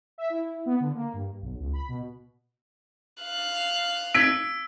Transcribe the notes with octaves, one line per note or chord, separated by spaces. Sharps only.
E5
E4
B3
D3
A#3
G2
B1
C#2
B5
B2
F5 F#6
E6 G#6 B6 D7